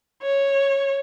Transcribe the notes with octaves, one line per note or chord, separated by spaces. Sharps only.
C#5